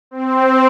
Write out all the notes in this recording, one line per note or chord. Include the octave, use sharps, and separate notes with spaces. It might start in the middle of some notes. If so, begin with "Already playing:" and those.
C4